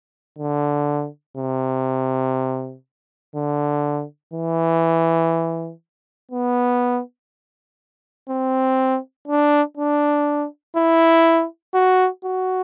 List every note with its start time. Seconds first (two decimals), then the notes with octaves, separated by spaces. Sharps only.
0.39 D3
1.37 C3
3.35 D3
4.34 E3
6.32 B3
8.29 C4
9.28 D4
9.77 D4
10.76 E4
11.74 F#4
12.25 F#4